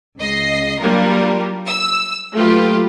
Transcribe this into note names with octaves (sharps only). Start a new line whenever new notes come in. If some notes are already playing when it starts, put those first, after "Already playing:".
C#2 D#5 C7
F#3 G3 A#3 D4 F4 A#4
E6
F#3 A3 A#3 F4 G4 B4